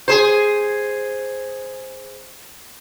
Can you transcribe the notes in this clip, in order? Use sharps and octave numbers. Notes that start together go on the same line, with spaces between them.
G#4 C5